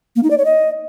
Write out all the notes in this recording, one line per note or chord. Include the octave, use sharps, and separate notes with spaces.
A#3
D#4
D5
C#5
D#5